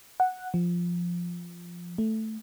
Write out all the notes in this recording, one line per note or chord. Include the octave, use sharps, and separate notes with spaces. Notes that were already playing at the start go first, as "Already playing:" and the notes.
F#5
F3
A3